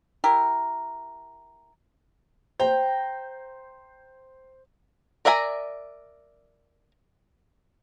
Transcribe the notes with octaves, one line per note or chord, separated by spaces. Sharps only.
E4 G4 A#4
C5 G5 A#5
A#4 D5 E5 G#5 A#5